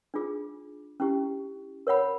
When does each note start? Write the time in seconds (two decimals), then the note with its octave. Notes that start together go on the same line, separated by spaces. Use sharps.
0.14 D4 F4 G#4
1.00 C#4 E4 G4
1.87 A#4 C#5 F#5 B5